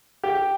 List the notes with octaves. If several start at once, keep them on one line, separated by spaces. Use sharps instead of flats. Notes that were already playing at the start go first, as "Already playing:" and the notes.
G4